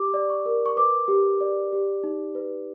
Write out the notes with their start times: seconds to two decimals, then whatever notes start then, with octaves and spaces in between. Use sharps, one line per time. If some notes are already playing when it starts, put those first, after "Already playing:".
Already playing: G4 D6
0.14 D5
0.30 C#6
0.46 A#4
0.66 C#6
0.77 B4 D6
1.08 G4
1.40 D5
1.73 G4
2.04 D#4
2.35 B4